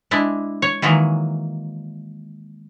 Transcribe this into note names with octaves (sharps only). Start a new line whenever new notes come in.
G#3 D4 E4
C#5
D#3 E3 F#3 G#3 A#3